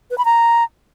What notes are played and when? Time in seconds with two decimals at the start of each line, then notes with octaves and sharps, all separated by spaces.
0.11 B4
0.18 B5
0.25 A#5